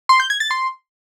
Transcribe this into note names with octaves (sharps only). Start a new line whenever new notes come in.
C6
G6
G#6
A6
C6